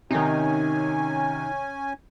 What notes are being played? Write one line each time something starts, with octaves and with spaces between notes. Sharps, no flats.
C3 D#3 C#4 D#4 G#5